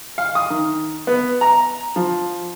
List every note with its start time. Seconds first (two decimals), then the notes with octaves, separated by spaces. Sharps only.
0.18 F5
0.35 D#6
0.50 D#3
1.07 B3
1.41 A#5
1.96 F3